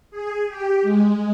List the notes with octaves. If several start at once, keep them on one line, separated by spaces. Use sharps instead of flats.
G#4
G4
G#3